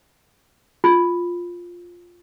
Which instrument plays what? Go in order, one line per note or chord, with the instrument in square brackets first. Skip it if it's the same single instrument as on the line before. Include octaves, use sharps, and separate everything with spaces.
[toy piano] F4